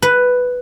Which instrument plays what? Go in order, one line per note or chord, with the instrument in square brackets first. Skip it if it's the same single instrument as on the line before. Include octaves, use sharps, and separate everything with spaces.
[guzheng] B4